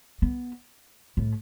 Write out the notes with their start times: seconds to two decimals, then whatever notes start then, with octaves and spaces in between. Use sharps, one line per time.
0.22 B3
1.17 A2